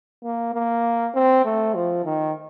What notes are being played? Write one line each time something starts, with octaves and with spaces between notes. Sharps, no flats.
A#3
A#3
C4
A3
F3
D#3